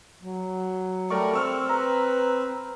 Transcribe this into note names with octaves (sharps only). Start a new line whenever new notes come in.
F#3
G3 A3 A#4 D5 C#6
C4 C#6 E6 F6
B4 A#5